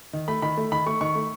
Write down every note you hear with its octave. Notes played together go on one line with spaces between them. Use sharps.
D#3
A3 B5
D#3 B5
A3
D#3 B5
A3 C#6
D#3 C#6
A3